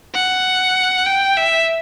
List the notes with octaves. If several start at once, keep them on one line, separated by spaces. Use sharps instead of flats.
F#5
G5
E5